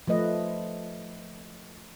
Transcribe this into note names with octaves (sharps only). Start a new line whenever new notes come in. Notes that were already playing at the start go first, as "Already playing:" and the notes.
F3 A3 B4 D#5